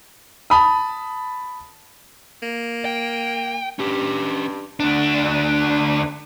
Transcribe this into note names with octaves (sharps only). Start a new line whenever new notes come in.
A5 B5 D#6
A#3
G5
G2 C#4 G4
D2 D4